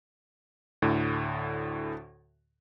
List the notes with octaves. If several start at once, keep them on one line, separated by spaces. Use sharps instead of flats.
D2 A2 D3